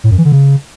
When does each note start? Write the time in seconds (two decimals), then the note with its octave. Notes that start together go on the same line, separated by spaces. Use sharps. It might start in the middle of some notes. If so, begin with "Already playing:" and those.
0.04 A2
0.11 F#2
0.18 E3
0.25 D3
0.32 C#3